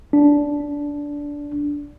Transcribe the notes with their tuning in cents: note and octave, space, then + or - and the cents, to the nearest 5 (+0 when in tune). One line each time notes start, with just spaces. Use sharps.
D4 -15